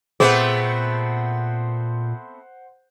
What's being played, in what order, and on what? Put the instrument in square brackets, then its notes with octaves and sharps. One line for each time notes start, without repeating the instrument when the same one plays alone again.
[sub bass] A#2 [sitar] A3 B3 C4 [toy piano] G#4 [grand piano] C5 F#5